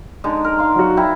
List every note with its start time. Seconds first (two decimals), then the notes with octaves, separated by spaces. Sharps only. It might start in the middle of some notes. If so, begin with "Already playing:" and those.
0.24 D3 G#3 D#4
0.44 A#4
0.58 F5 C6
0.76 F#3 F#4
0.97 E4 G5 A#5